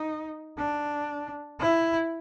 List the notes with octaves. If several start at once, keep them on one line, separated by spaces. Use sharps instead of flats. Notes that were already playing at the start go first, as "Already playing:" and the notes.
Already playing: D#4
D4
E4